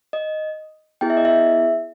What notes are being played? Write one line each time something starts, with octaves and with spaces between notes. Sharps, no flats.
D#5
B3 E4 G#4 G5
E5
D#5
E5